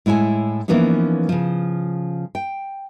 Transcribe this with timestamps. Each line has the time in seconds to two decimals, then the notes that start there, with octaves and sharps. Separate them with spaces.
0.06 A2 G#3 E4 C#5 G#5
0.68 E3 F3 A#3 B3 C#4 D#4
1.29 C#3 F3
2.35 G5